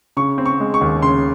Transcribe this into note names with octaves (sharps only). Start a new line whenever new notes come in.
C#3 C#6
C4
C#6
G#3
C#6
D#2
C#3 C6